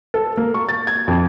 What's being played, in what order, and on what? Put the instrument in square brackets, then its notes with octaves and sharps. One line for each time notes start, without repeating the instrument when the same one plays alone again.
[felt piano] A4
A#3
C#6
A6
G#6
F2